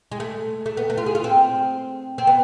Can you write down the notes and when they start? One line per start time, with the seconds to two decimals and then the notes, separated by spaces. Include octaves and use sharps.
0.12 G#3
0.20 A3
0.66 A3
0.77 B3
0.90 A3
0.98 F4
1.06 G#4
1.15 F4
1.24 C4
2.18 C4
2.27 B3